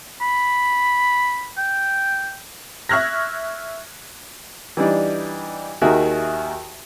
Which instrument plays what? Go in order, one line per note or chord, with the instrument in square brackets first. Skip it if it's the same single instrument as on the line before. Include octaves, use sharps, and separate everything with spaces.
[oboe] B5
G5
[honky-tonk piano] E5 C#6 F6 F#6 G#6 A#6
[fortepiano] E3 G3 D4 D#4
D#2 D#3 F#4 G#4 A#4 E5